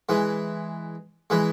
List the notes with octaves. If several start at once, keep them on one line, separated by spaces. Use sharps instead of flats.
E3 G#3
E3 G#3